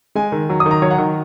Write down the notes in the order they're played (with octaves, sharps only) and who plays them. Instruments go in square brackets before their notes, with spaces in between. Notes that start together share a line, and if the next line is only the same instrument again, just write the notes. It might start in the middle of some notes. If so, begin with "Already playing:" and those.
[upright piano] G#3 G#5
D#3
F#3
D#6
D#3
A#5
F#3 C#5
F#5
D#3